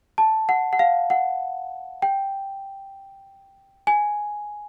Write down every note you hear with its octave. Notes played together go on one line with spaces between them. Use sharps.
A5
F#5
F#5
F5
F#5
G5
G#5